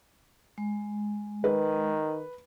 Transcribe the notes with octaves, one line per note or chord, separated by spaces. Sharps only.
G#3
D#3 B4